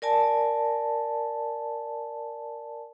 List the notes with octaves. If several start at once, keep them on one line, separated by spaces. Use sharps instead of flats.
A#4 D5 G#5 A5